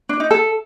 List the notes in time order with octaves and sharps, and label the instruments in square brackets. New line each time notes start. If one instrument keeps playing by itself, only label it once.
[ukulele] D4
D#4
A4